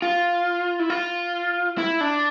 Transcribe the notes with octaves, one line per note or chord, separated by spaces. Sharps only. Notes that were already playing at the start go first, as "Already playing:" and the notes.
F4
E4
F4
E4
D4